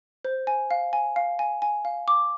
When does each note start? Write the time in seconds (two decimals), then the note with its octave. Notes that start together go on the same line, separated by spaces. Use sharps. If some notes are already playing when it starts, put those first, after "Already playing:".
0.25 C5
0.47 G#5
0.71 F5
0.93 G#5
1.16 F5
1.39 G#5
1.62 G#5
1.85 F5
2.08 D6